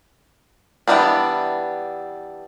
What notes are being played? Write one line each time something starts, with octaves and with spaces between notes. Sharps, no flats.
E3 F#3 G3 B3 D4